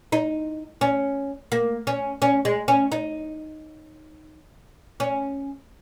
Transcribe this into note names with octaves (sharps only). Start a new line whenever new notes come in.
D#4
C#4
A#3
C#4
C#4
G#3
C#4
D#4
C#4